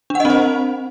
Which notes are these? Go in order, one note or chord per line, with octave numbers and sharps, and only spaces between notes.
C4 D4 C5 D#5 F#5